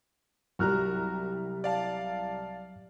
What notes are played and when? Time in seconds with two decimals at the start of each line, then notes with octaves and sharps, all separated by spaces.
0.59 C2 F#3 G3 F#4 A#4 A#5 F6 F#6
1.64 D5 F5 A5